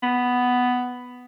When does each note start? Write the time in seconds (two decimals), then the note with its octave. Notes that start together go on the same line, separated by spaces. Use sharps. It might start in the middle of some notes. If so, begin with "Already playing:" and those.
0.03 B3